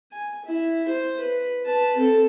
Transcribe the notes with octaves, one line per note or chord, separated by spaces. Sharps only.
G#5
E4
C5
B4
B4 A5
C4 A4